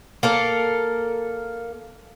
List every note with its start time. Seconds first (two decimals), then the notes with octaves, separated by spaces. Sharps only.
0.23 A#3 A4 A#4